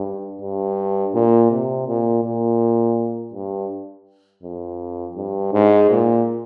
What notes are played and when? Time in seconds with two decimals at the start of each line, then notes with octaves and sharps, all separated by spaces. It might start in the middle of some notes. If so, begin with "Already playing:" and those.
Already playing: G2
0.41 G2
1.14 A#2
1.51 C3
1.87 A#2
2.24 A#2
3.34 G2
4.43 F2
5.16 G2
5.53 G#2
5.90 A#2